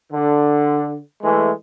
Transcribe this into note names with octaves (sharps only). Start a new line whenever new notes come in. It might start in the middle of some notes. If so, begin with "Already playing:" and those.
D3
E3 G#3 A3